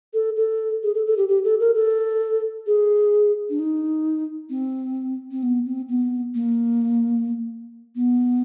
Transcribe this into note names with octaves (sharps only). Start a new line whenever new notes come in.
A4
A4
G#4
A4
A4
G4
G4
A4
A#4
A4
G#4
D4
D#4
C4
C4
B3
C4
B3
A#3
B3